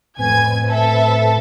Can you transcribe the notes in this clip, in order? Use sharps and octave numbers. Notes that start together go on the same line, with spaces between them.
F2 A2 C4 B4 G#5 G#6
A4 E5